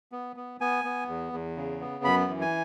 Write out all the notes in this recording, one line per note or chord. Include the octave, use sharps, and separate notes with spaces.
B3
B3
B3 G#5
B3
E2
E2
C#3
B3
F#2 B5
E3
G#5